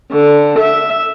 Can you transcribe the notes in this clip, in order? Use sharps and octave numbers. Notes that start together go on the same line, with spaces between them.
D3
E5